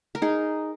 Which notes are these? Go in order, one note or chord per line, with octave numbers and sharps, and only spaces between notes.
A#4
D#4 G#4